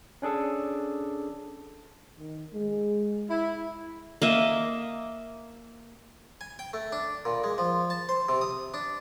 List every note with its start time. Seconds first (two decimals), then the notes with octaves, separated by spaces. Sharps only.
0.22 C#4 D4 G#4 A4
2.20 D#3
2.53 G#3
3.29 E4
4.22 A#3 D#5 E5
6.41 G#5
6.59 G5
6.74 A3
6.92 D4
7.25 A#2
7.44 G#3
7.58 F3
7.90 A5
8.09 C5
8.29 C3
8.41 D#6
8.74 D4